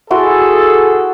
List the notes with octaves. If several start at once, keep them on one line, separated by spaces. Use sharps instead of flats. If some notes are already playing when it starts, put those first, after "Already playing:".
E4 F#4 G#4 A4 C6